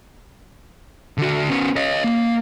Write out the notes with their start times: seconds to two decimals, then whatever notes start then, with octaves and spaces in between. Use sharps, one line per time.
1.18 D3 F#4
1.49 B3 C#4
1.76 C#5 D#5
2.04 A#3